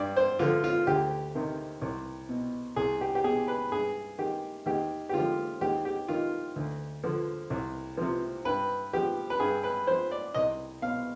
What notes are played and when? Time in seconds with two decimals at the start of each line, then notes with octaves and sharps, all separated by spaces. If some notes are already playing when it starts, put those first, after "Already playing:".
Already playing: G2 D5
0.17 C5
0.39 D3 F3 F4
0.64 F4
0.87 D2 G4
1.35 C3 D#3
1.82 C2
2.29 B2
2.76 C2 G#4
3.01 G4
3.15 G4
3.24 B2 G#4
3.48 B4
3.72 G2 G#4
4.18 D#3 G4
4.66 D#2 G4
5.09 G4
5.13 D3 F3 F4
5.61 D#2 G4
5.85 G4
6.08 D#3 F4
6.56 D2
7.04 D3 F3
7.50 C2
7.97 C3 F3
8.45 G2 B4
8.93 F3 G4
9.30 B4
9.40 G2 G#4
9.64 B4
9.87 F3 C5
10.11 D5
10.34 C2 D#5
10.82 B2 F5